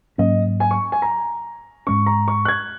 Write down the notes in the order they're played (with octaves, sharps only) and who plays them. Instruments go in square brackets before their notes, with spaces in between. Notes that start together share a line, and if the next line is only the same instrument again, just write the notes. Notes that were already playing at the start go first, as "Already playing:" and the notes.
[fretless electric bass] G#2 F#3 A#3 C#4 [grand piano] D#5
[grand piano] G#5
C#6
G#5
A#5
[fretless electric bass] G#2 G#3 C#4 [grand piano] C#6
[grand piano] A#5
C#6
F#6
G#6